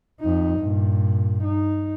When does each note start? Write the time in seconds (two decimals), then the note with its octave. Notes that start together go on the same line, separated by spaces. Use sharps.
0.20 F2 D#4
0.60 G2 A#2
1.44 D#4